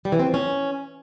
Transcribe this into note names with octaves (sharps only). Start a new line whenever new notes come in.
G3
E3
C4
F3
C#4